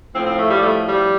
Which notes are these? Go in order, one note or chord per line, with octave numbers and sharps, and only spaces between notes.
A2 F3 C4
C4
A3
G3
A3
G3